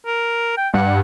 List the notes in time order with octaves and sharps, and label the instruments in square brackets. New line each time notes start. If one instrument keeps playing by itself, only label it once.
[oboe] A#4
G5
[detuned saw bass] G2 [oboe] F#5